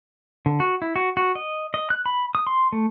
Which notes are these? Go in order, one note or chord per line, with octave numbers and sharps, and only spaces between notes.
D3
F#4
E4
F#4
F#4
D#5
D#5
F#6
B5
D#6
C6
A3